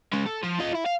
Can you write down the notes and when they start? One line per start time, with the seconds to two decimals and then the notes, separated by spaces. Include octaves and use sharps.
0.13 G#3 C#4
0.25 A4
0.43 F3
0.59 F4 D#5
0.74 E4
0.86 F5